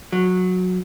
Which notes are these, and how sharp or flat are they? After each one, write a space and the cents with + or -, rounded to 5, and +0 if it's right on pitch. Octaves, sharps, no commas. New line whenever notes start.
F#3 -15